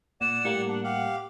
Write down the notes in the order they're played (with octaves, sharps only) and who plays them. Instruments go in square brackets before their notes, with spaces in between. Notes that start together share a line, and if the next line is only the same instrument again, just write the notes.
[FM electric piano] A#2 [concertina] D5 F#5 [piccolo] E7
[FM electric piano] A2 G3 A#3 [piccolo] C#7
[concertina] D4 [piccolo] F#5
[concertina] G4 F5